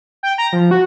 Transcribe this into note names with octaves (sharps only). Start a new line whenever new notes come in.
G5
A#5
F3
F#4